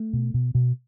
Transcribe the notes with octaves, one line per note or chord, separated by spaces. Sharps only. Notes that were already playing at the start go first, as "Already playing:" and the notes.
Already playing: A3
B2
B2
B2